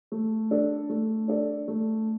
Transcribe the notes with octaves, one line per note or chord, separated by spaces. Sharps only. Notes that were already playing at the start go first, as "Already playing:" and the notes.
A3
D4 A4 D5
A3
D4 A4 D5
A3